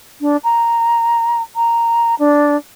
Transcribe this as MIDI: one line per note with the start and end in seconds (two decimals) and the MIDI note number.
0.21 0.36 62
0.44 1.41 82
1.55 2.14 82
2.19 2.56 62